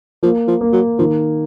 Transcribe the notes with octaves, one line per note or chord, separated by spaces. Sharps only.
F3 A#3
F3
A#3
F#3
D#3 F3